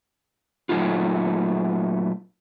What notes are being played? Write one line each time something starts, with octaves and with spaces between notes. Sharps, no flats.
A#2 F#3 G#3 A3 D#4 F4